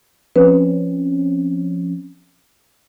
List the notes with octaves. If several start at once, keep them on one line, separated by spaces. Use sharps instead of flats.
F3 C4 C#4 B4